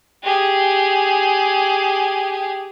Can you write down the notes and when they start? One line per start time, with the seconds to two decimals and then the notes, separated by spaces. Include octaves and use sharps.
0.23 G4 G#4